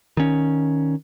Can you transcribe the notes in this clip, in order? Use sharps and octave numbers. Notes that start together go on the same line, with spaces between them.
D#3 C#4